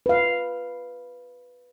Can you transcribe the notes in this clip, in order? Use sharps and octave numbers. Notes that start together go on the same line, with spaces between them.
B4 F5